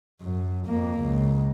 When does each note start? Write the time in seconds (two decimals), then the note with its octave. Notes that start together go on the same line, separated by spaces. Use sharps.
0.22 F#2
0.66 F2 A#3
1.02 C#2